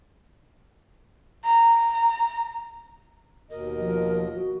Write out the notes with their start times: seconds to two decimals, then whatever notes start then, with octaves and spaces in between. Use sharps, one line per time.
1.45 A#5
3.51 D#2 B2 A#4 D#5
3.78 F3
4.35 F#4